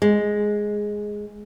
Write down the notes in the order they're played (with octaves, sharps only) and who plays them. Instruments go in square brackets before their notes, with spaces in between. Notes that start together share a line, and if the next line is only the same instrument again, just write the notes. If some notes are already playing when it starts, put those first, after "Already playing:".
[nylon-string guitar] G#3